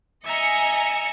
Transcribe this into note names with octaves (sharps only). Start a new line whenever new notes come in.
D#5 E5 G#5 A#5 C#7